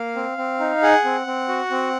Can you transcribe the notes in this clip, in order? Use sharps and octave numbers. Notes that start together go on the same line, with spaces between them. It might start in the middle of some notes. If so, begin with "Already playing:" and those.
Already playing: A#3 F5
C4
C4
D#4
G#4 F#5
C4
C4
F#4
C4